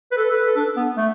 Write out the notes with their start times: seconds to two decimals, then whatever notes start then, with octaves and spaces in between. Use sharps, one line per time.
0.12 B4
0.17 A4
0.31 B4
0.47 A4
0.56 D4
0.76 B3
0.97 A3